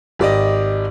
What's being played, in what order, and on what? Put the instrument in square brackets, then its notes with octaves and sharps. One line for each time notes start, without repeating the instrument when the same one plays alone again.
[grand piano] G#1 G4 D5 D#5